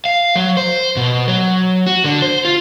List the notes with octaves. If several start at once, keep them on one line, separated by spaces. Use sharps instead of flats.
F5
F#3
C5
B2
F#3
F#4
D3
C5
F4